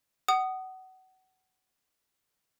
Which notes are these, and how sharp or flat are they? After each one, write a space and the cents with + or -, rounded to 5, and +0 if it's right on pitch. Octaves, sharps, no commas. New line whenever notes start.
F#5 +25 D#6 -10